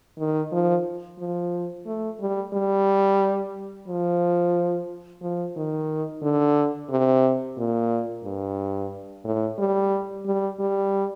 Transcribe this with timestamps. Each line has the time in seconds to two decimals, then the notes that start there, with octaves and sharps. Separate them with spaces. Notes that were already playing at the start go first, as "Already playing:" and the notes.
0.19 D#3
0.52 F3
1.20 F3
1.86 A3
2.20 G3
2.54 G3
3.88 F3
5.22 F3
5.56 D#3
6.23 D3
6.90 C3
7.57 A#2
8.24 G2
9.24 A2
9.59 G3
10.26 G3
10.60 G3